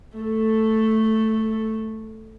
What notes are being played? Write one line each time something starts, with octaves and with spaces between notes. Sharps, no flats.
A3 A4